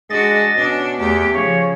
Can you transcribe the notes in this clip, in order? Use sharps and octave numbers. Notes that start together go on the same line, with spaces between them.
G#3 D4 F#4 D#5 A6
B2 C#4 D4
E2 A3 G4
C#3 F3 C#5